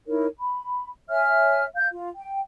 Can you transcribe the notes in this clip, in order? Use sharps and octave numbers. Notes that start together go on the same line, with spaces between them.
D#4 E4 A#4 C#5
B5
C#5 E5 G#5 F6
F5 G6
F4
G5